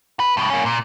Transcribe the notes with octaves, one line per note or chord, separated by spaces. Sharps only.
B4
G2 B2
A#3 C#4
A#2